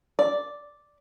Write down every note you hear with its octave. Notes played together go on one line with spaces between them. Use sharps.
D5